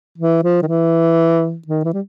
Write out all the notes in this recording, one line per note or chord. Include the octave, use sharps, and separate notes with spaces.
E3
F3
D#3
E3
D#3
E3
G3